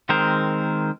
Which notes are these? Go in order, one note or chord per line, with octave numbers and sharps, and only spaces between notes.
D#3 G#3 C4 A#4 C5